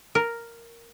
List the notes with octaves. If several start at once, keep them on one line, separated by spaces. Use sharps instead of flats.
A#4